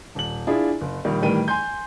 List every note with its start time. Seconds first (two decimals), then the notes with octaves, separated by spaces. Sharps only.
0.15 D#1 F#7
0.47 D4 E4 F4 G#4
0.81 F#1
1.05 A#1 D#3 G3
1.22 A2 D#3 E3 G3 G5 D#7
1.48 G#5 C6 G6